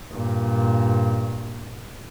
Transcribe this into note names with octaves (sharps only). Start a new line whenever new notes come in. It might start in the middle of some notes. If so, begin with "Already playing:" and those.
G2 A#2